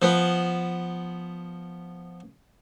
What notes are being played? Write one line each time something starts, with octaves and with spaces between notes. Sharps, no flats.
F3 B3